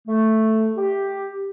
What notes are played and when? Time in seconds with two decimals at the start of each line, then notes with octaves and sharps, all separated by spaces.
0.08 A3
0.77 G4